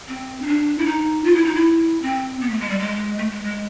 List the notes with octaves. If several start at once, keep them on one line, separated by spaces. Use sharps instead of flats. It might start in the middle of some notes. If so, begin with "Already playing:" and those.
C4
D#4
D4
E4
D#4
F4
E4
D#4
E4
C4
B3
A3
G#3
G3
G#3
A3
G#3
G#3